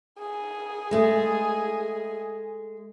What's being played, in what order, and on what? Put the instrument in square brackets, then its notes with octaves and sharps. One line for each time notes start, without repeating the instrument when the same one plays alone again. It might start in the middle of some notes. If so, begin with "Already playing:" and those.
[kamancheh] G#4
[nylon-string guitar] G#3 A3